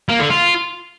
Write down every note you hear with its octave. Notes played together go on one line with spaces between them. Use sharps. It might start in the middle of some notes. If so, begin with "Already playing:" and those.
A#3
D3
F4